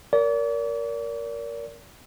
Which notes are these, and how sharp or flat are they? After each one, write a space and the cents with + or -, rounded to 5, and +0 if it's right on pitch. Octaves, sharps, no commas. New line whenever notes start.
A#4 +0 D5 -40